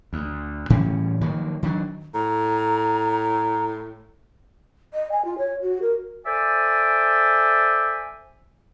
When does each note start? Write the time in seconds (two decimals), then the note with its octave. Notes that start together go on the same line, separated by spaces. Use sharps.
0.13 D2
0.70 A2 E3 G3 C#4
1.21 D#3 F3 F#3 A#3
1.63 D#3 F#3 D4
2.14 A2 A#5
4.94 D#5
5.12 G#5
5.25 F4
5.38 C#5
5.62 F#4
5.82 A#4
6.26 A4 C5 D5 E5 G#5